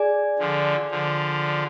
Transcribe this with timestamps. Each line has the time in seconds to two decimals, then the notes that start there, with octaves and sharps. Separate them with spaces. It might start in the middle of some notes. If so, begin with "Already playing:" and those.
Already playing: G#4 D5 G#5
0.39 D3 F3
0.91 D3 F3